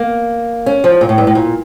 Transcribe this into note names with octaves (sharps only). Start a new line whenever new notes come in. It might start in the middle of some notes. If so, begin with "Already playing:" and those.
Already playing: A#3
C#4
F3
A#2
A2
G2
A2
A#2